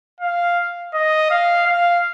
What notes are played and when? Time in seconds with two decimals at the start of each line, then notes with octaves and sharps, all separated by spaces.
0.20 F5
0.94 D#5
1.31 F5
1.67 F5